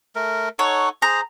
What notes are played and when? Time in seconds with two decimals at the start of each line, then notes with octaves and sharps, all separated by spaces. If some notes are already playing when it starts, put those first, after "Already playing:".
0.16 A3 A#4
0.59 D#4 A4 C#5 F#5
1.02 G#4 C5 A#5